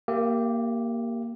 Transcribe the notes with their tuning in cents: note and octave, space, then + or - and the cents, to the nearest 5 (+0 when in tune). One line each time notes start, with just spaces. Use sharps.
A#3 +0 G4 -5 E5 +45